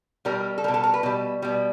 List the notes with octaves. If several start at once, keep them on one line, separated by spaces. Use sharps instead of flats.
B2 G3 A#4
A4
B2 G3 A#4
A4
A#4
B4
B2 G3
B2 G3